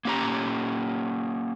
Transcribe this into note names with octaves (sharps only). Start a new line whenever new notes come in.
A#3 C#4 G4 D#5 A#5